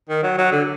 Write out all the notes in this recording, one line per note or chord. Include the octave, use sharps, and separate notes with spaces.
D#3
F#3
F#3
D3